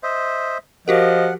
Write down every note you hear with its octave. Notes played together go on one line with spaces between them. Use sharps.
C5 D#5 E5
F3 F#4 G4 A#4 D#5 F#5